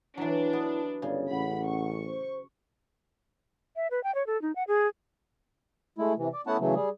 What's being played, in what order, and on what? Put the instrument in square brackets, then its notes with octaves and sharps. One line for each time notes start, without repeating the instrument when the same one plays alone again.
[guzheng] E3 F#3 [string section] D4 [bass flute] E4
[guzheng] B3
[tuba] G1 [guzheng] C#3 [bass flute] D5
[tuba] A1 [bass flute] F#5 [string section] B5
[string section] C#6
[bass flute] C5
[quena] E5
B4
G5
C#5
A4
D#4
F#5
G#4
[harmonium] G#3 A3 E4
C3 E3
D5
A3 B3 C#4 E4 F#5 A5
C#3 E3 F#3 A3
G3 G#4